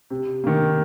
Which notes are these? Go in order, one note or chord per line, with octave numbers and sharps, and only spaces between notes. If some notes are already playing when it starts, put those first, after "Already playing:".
C3
D#3 A#3